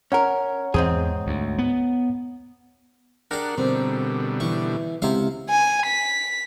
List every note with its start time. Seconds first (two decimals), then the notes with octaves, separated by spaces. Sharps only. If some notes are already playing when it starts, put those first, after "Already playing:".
0.12 C#4 A#4 C#5 F#5 A#5
0.74 E2 G#2 C4 G#4
1.27 D2
1.58 B3
3.31 D4 G4 G#4 A#4 D5 F#5
3.58 B2 D3 G3 C4
4.40 E3 C#6
5.02 C#2 C3 E4 F5 F#5
5.50 G#5
5.87 B6